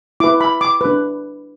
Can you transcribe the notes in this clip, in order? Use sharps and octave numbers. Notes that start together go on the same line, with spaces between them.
E4 B4 D6
B5
D6
D4 B4